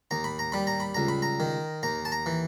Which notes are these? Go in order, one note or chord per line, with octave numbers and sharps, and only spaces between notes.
D#2 A#5
B5
A#5
G3 B5
A#5
B5
C#2 A#5
B5
A#5
D#3
D#2 A#5
A5
A#5
E3